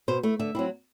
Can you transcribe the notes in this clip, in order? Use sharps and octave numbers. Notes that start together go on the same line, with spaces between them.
B2 C5
A3 E4
D3 E5
F#3 C4 E4